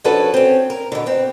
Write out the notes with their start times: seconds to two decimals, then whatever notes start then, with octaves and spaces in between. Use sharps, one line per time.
0.04 F3 C#4 D4 F#4 A4 B4
0.34 C4 C#4
0.70 A#4
0.92 B2 D3
1.06 B3 C4